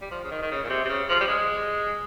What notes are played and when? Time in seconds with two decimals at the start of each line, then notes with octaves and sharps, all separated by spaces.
0.01 G3
0.11 F3
0.24 C#3
0.31 D#3
0.42 D#3
0.51 C#3
0.64 A#2
0.70 C3
0.85 C3
0.89 C#3
1.09 F3
1.20 G3
1.28 G#3